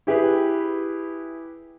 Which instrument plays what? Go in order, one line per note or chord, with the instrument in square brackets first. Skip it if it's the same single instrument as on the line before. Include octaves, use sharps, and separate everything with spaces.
[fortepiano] E4 G4 G#4 B4